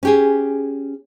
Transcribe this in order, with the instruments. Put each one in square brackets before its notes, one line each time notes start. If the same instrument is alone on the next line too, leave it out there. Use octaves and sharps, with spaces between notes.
[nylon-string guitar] C#4 G4 G#4